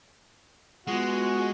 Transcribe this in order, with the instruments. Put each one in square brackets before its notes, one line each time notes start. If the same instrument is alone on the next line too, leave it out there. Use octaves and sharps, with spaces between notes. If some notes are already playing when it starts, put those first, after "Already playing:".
[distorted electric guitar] G#3 [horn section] B3 F#4 [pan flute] F4